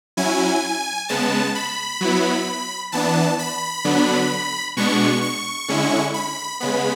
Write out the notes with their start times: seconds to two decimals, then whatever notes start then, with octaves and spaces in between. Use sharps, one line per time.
0.17 F#3 C#4 E4 G#5
1.09 C#3 G#3 B3 A5
1.55 B5
2.01 F#3 B3 E4
2.92 E3 B3 D4 A5
3.39 B5
3.84 D3 F#3 B3 D4
4.77 B2 G#3 B3 D4 C#6
5.22 C#6
5.68 D3 G#3 C#4 E4
6.14 B5
6.60 C#3 G#3 B3 B5